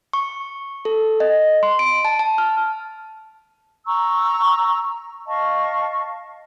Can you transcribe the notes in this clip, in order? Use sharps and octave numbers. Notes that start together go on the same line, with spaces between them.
C#6
A4
D#5
C6
D7
A5
A5
F6
A#5 C#6 E6
D#5 F5 A5 C#6